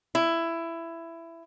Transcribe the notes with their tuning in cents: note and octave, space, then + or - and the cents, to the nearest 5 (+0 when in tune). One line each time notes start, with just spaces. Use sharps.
E4 +15